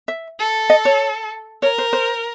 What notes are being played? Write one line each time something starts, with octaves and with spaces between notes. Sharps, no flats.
E5
A4
D#5
C#5
A#4 C#5
C5
C5